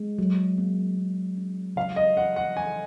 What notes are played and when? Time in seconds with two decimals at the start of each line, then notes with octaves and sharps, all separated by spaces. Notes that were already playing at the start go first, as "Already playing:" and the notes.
Already playing: G#3
0.18 F#3
0.58 A#3
0.97 A#3
1.37 C#4
1.76 C#3 F5
1.96 D#5
2.17 F#3 F#5
2.36 F#5
2.56 G#3 G#5